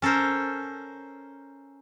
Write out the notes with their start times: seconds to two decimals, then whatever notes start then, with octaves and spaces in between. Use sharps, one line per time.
0.02 C#4 A4 A#4 C5